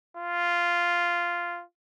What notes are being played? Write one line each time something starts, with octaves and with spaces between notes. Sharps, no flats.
F4